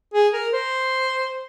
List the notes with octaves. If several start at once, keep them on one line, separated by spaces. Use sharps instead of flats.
G#4
A#4
C5